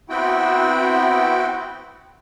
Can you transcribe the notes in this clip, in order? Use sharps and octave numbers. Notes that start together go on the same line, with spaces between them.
B3 C4 E4 F#4 G5